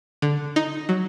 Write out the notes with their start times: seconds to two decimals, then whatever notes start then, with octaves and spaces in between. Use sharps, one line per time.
0.22 D3
0.56 D#4
0.89 F#3